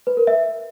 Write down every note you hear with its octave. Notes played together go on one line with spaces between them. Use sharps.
B4
A#4
E5